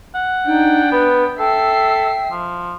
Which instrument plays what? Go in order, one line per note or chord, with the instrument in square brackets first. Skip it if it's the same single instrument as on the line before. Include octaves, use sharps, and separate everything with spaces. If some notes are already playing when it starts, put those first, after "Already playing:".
[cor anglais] F#5
[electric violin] D4 G5 [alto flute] D#4
[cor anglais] B3 [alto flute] B4
[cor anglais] A4 [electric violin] E5 C7 [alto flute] G5
[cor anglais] F3